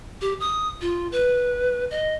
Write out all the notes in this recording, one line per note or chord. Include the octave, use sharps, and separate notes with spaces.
G4
D#6
F4
B4
D#5